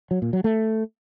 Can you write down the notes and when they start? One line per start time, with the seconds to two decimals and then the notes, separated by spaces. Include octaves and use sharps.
0.11 F#3
0.22 A#2
0.33 F#3
0.44 A3